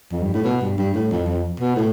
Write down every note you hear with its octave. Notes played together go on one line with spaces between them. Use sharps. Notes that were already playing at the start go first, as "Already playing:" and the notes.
F2
G2
A2
B2
G2
G2
A2
F2
F2
B2
A2